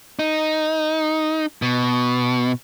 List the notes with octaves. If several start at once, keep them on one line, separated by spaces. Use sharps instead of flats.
D#4
B2